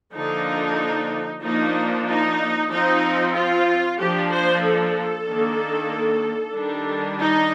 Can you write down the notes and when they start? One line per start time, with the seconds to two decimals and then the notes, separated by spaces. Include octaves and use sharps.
0.14 D3 F3 A#3 D4 D#4
1.42 F3 A#3 D4 D#4
2.07 D#4
2.70 F3 C4 D#4
3.34 F4
3.99 F3 A#3 D4 G4
4.31 C5
4.62 A4
5.26 D#3 A#3 D4
6.55 D#3 G3 D4
7.20 D#4